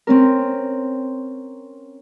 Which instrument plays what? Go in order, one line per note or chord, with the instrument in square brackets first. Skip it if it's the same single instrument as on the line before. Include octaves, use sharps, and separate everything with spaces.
[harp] C4 C#4 A#4